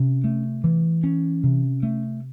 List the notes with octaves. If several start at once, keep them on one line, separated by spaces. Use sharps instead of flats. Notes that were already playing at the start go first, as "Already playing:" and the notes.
Already playing: C3 C#4
A3
E3
C#4
C3
A3